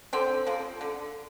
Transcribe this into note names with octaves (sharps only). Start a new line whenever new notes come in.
D3 C4
F3 A#3
D3